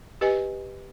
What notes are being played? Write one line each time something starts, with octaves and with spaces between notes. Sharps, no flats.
G4 B4 D#5 G#5